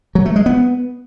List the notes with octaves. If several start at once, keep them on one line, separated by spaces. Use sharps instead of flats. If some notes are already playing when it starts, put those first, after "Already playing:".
F#3
A3
G#3
B3